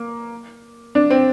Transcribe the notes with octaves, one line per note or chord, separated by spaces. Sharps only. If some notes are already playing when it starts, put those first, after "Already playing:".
Already playing: A#3
D4
C4